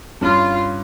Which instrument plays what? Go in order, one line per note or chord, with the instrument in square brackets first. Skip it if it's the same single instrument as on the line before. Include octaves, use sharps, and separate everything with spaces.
[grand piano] G2 C#4 [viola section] F4